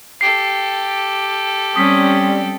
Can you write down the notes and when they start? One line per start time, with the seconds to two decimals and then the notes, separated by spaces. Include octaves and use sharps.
0.21 G4 A4 C7
1.76 G3 C4 C#4 D#6 B6